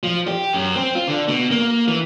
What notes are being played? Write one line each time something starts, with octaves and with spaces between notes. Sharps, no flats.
F3
G4
F#2
C4
F4
D3
B2
A#3
E3